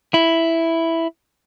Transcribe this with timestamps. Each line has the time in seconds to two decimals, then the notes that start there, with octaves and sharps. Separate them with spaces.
0.14 E4